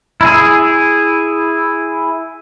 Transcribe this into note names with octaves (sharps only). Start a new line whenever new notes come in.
E4 G#4